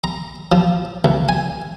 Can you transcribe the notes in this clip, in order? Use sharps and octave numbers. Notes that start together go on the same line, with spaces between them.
A#5
F3
C#2
G#5